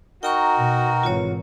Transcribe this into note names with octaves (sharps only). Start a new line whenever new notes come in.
D#4 F#4 A#4 G5 A#5 C#6
B2
G#1 E3 F4 C#5